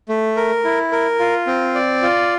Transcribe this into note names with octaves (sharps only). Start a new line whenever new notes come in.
A3
A#4
E4
A#4
F4
C4
D5
F4